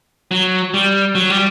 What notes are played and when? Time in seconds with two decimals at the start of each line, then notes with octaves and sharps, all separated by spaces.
0.31 F#3
0.74 G3
1.15 F#3
1.30 G3